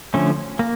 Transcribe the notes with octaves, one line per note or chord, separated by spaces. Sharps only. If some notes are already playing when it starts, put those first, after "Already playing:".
D3 F3 A3 C#4
A#3